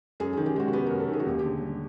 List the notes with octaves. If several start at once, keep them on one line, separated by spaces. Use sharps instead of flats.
F#2 G#4
D#3 G#4
G4
G#3 F#4
F#4
B3 G4
F#2 A#4
A4
D#3 G#4
F#4
D#2 G4
G#4
D3 G4
G3